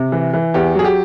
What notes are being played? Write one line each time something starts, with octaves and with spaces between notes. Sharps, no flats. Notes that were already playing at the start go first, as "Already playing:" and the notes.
Already playing: C3
E3
E3
E2 G4
F#3 G#4
G4